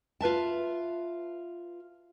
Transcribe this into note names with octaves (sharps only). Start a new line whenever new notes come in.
F4 B4 E5 A5